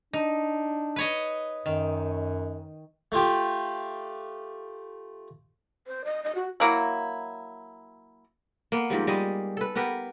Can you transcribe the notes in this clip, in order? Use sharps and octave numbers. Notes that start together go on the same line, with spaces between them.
D4 D#4
B4 C#5 D#5
F#2 D#3
A3 F4 G4
C5
D#5
D#5
F#4
F#3 A#3 E4
A#3 B3
G#2 F3 G3
G3 G#3 D#5
A4 B4
B3 G4 A#4 B4